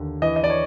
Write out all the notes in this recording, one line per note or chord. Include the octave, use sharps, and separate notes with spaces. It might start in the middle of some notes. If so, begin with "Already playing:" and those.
Already playing: D#2 D3
E3 D#5
D#5
D5
C#5